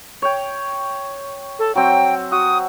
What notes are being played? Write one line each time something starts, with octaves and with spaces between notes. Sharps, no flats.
C#5 G5
A4
F#3 C4 G5
F#4 D#6